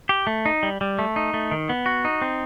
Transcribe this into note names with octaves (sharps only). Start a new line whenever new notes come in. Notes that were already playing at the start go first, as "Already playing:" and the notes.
G4
A3
D#4
G3
G3
A3
D#4
A3
D#3
B3
F#4
D#4
C4